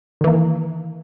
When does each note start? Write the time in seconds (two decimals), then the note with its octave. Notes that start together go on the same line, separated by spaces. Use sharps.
0.21 D#3
0.24 E3
0.27 A#3